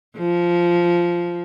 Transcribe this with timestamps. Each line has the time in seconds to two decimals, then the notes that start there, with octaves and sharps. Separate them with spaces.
0.18 F3